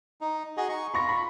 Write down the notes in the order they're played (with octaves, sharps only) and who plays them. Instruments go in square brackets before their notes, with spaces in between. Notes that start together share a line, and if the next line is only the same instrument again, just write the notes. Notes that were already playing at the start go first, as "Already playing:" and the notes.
[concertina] D#4
F#4 G#4 D#5
D#4 C#6
[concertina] F4 [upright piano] B5 C#6 A#6
[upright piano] B5